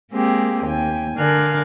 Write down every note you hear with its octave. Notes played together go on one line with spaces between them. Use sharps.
G#3 A#3 C4 G4 G#4
D#2 G5 G#5
D3 D4 A#4 F5 G#5 F#6